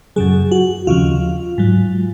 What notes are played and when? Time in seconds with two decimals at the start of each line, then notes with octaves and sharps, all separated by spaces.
0.16 F#2 C#3 F#3 G#4
0.51 F#4
0.87 D#2 C#3 F3 F4
1.58 G#2 F#3